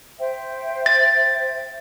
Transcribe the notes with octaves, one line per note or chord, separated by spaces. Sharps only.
C5 E5 G5
A6